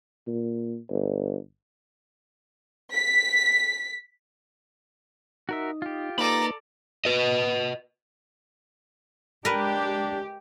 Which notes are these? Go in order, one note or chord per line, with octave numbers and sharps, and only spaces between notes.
A#2
G1
B6
D#4 F#4 A#4 E5
F4 G4
A#3 D#4 A4 B4 D5 A#5 B5
B4 D#5
G#3 D4 G4 A#4 B4